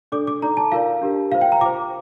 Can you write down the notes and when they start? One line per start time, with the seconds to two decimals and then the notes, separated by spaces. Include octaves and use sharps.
0.12 D4 A4 D5 D6
0.27 D6
0.42 D#4 A4 D5 A#5
0.57 A5
0.72 F4 A#4 D5 F5
1.02 D4 G4 A#4
1.32 F4 C5 F5
1.41 G5
1.52 A#5
1.61 F4 C5 D6